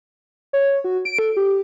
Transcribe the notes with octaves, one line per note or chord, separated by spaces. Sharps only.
C#5
F#4
D7
A4
G4